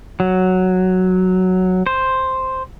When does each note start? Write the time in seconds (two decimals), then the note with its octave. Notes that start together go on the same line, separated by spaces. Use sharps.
0.20 F#3
1.87 C5